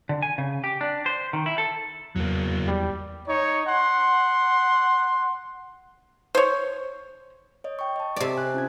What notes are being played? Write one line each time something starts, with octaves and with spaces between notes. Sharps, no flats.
D3
G#5
C#3
G4
D4
C5
D#3
E4
A4
E2 F#3 A#3
G3
D#4 C#5
F#5 C6
C5 C#5
C#5 D#5
G5 C#6
D#5 A5
C3 D5
G#5 F#6
C#4 F4 G#6